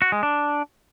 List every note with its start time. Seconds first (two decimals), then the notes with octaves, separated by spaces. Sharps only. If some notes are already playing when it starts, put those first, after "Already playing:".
0.02 F#4
0.12 G#3
0.23 D4